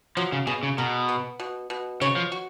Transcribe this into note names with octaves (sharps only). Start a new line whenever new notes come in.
F3 F#3
C#3
B2 G#4
C#3
B2 A#4
B3
B2
B2
C#3 C#5
F3
F#4